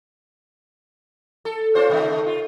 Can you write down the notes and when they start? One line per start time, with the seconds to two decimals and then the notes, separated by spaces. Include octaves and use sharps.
1.45 A4
1.75 C#4 F4 C5
1.90 C3 D#3 A3
2.26 F4